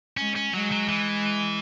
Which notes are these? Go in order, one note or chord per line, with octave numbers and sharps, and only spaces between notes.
G#3 C#4
C#4
F#3 G#3
F#3
E3